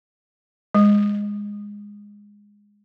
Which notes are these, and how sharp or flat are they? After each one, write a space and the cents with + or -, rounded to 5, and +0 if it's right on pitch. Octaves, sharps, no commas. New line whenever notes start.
G#3 -15